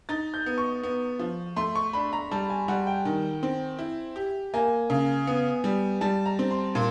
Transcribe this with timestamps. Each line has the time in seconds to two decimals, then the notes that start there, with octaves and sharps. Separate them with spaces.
0.09 D#4 A6
0.34 G6
0.46 B3
0.58 C#6
0.83 B3
1.19 F3
1.56 A3 C6
1.75 C#6
1.93 D4 B5
2.13 A#5
2.31 G3 A5
2.50 G#5
2.68 G3 F#5
2.87 G5
3.05 D#3
3.43 C4
3.79 E4
4.16 G4
4.54 A#3 G#5
4.90 C#3
5.27 B3
5.64 G3
6.01 G3 A5
6.26 A#5
6.39 C4
6.51 C6
6.75 A#2 C6